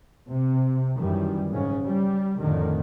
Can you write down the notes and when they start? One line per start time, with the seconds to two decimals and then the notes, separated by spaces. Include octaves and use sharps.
0.30 C3
0.96 F#2 D#3 E3 G3
1.51 G#2 C#3 C#4
1.85 G3
2.40 F2 A2 D3 D#3